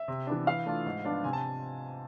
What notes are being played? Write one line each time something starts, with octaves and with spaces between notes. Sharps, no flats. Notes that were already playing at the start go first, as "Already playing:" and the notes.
Already playing: E5
C3
E3 B3 D4
E3 F5
A3 D4 F4
G#2
F3 B3 D4 F4
C3 G#5
A5